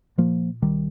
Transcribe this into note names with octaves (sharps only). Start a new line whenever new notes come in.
A#2 F3 A#3
C2 D#3 G3